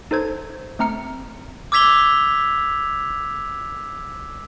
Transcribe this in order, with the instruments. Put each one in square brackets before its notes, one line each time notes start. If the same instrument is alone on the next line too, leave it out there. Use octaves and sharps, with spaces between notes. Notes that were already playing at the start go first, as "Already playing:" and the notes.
[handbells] D#4 A4 C5 G#6
A3 C4 A#5 F6 C#7
[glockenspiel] D6 E6 G#6 B6 F7 G7